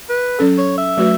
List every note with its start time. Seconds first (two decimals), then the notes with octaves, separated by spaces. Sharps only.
0.10 B4
0.39 F#3 C#4 A4
0.58 C#5
0.78 E5
0.97 F#3 A3 F#4 B4